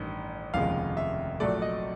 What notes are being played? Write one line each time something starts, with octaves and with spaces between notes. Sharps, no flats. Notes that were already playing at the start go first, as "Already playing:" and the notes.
Already playing: A1 G2 D#3
F1 D#2 C#3 F3 G#3 F5
E5
A#1 A#2 F#3 A3 D5
D#5